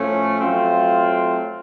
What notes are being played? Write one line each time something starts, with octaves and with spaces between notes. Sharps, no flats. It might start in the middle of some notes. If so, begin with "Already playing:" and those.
Already playing: A2 F3 A3 C#4
F#3 A3 C4 F4